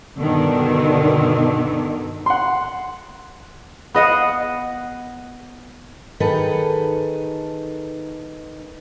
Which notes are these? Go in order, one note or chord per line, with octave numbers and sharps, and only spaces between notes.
G2 B2 D3 D#3
F#5 C6
B3 D#5 F5 F#5
D#3 D#4 G#4 A4 B4